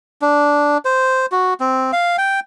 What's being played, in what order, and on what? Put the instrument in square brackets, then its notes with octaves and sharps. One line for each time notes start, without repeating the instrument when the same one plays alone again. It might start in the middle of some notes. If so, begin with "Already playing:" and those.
[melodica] D4
C5
F#4
C4
F5
G5